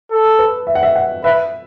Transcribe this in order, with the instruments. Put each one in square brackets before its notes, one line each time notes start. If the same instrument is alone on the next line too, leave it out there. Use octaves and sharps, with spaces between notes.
[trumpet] A4
[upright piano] B4
E5
F#5
E5
F#5
[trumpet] B4 [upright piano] E5